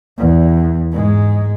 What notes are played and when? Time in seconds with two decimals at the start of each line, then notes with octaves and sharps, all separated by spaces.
0.18 E2
0.92 G#2 G#3